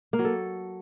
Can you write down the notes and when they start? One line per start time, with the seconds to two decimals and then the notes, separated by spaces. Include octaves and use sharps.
0.13 A#3
0.19 F#3
0.25 A4